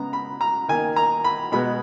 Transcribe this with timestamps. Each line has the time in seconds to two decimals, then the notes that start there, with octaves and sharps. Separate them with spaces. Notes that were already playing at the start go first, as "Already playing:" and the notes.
Already playing: C#3 G#3 B3 A#5
0.13 B5
0.41 A#5
0.68 D#3 A#3 G#5
0.96 A#5
1.24 B5
1.52 B2 G#3 B3 B5